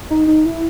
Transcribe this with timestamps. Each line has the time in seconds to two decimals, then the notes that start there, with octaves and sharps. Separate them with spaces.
0.10 D#4
0.27 D#4
0.46 E4